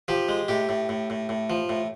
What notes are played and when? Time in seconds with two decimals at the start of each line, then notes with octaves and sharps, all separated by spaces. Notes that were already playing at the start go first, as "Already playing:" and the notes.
0.08 F3 G4
0.29 G#3
0.48 A2 G4
0.69 A2
0.89 A2
1.10 A2
1.29 A2
1.50 F3
1.69 A2